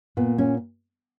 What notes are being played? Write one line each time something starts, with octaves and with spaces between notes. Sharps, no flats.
A#2 B3
C#4